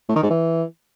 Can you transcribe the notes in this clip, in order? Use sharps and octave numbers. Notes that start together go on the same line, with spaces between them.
A2
D#3
G#2
E3